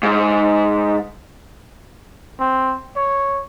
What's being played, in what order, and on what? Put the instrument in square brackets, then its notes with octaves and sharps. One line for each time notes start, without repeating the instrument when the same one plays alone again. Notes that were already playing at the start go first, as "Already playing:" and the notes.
[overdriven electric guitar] G#2
[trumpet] C4
C#5